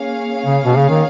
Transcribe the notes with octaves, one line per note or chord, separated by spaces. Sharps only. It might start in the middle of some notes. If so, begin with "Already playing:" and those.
Already playing: A#3 C#4 G#4 C#5 F5
C#3
B2
C#3
D#3